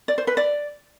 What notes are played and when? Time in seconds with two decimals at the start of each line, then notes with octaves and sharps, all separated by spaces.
0.08 D5
0.18 C5
0.27 B4
0.37 D5